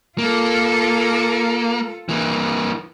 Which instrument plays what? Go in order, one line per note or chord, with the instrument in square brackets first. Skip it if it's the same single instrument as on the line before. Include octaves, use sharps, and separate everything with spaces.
[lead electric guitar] A#3 [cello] F4 A4
[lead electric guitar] E3 A#3